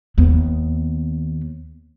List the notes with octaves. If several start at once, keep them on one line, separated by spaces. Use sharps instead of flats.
D#2 B3